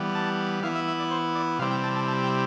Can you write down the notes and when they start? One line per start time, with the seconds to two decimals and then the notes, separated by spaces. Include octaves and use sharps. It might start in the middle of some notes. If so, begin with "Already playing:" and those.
Already playing: E3 G3 B3
0.15 A5
0.63 E3 B3 E4 F5
0.75 E5
0.88 E5
0.99 D5
1.11 C5
1.35 D5
1.59 C3 G3 C4 E4 F5
1.71 G5
1.84 A5
1.95 A5
2.08 A5
2.24 G5